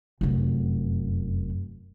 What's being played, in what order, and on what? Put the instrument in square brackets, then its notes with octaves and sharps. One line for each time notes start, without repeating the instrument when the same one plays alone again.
[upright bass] F1 F#2